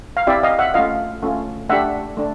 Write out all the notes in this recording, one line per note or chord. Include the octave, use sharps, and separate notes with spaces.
F5
C4 E4 G4 D5 E5
D#5 F5
E5 F#5
A3 C#4 F4 D#5 F5
A3 C#4 F4
A3 D4 G4 E5 F#5
A3 D4